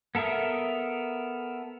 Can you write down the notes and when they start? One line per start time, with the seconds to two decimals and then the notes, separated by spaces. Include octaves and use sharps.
0.15 B3 A4 A#4 E5 D#6